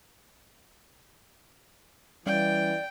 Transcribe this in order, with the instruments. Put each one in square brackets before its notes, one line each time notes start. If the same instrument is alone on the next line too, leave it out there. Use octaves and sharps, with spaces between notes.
[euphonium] E3 [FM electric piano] G3 C#4 F5 [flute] D5 [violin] G5